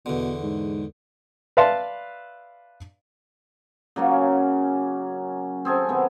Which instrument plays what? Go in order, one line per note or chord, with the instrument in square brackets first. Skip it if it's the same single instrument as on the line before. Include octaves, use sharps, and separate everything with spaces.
[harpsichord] E2 D3 [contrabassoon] B2
[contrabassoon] G#2
[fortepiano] B4 D5 E5 F5 A5 C6
[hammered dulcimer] C#3 F#3 A#3 C#4
C4 G#4 A4 G#5
C3 D#3 B3